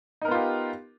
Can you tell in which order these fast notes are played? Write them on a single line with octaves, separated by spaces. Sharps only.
D#4 A#4 B3 F4 G4